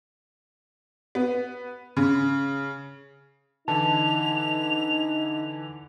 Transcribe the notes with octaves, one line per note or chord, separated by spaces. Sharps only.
B3
C#3
D3 E3 D#4 A5 F7